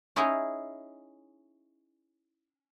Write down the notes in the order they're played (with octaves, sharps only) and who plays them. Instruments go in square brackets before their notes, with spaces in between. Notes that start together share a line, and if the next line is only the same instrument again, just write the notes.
[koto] C#4 D#4 E4 G#4 C#5 D#5